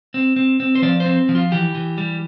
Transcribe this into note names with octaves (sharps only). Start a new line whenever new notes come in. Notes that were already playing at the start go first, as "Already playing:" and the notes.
C4
C4
C4
C5
F3 D5
C5
C4
F3
F4
E3 G4
E3
G3